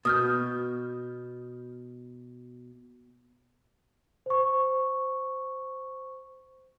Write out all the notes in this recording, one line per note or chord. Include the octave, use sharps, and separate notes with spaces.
B2 D#6 F6 G6
C5 C#6